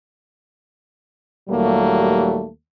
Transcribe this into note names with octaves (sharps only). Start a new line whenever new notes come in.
D#2 A#2 F#3 G3 A3 A#3